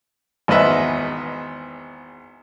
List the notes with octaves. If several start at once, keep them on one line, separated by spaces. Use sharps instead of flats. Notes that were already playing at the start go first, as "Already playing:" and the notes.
G#1 E2 B4 D#5 E5